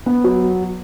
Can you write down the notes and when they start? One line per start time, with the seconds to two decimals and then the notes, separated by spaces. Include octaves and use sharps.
0.06 B3
0.24 F#3